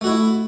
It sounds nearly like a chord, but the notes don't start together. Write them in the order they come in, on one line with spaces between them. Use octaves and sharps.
A3 F#4 E4